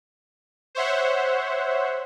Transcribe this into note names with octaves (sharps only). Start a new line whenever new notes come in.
C5 C#5 E5 F#5